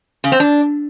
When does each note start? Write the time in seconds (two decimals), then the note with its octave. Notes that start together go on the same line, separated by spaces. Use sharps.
0.24 C#3
0.32 C4
0.40 D4